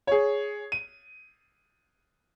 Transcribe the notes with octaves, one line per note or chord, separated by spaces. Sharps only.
G#4 C#5
D#7